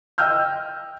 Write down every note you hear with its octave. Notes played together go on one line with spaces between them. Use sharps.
D#5 G5 E6 F6 G6